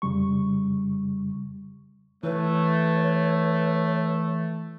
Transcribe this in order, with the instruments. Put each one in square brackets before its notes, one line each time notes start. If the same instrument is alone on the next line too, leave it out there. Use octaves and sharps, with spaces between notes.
[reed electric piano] F2 C#3 G3 C#6
[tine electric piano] E3 [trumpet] A3 [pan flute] B4 [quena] C#5